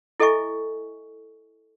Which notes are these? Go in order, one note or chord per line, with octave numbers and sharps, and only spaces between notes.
E4 A4 D#5 E5 G#5 C#6